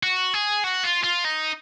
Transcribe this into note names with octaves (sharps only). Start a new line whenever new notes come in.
F#4
G#4
F#4
F4
F4
D#4